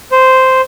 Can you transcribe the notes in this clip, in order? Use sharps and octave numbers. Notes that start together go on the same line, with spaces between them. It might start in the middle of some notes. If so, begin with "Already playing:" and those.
C5